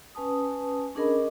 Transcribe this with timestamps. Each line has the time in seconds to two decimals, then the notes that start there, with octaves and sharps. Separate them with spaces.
0.15 C#4 B4 G#5 A5 D#6
0.95 C#4 D4 G#4 A#4 D#5 B5